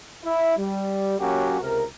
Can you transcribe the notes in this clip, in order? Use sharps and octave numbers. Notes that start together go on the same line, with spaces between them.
E4
G3
F#3 A#3 C#4 F#4 G4
C#2 C3 A#4